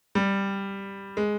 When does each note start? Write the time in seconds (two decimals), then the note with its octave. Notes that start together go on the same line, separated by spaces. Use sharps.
0.15 G3
1.17 G#3